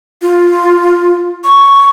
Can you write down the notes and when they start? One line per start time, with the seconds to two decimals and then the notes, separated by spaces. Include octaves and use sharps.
0.22 F4
1.44 C#6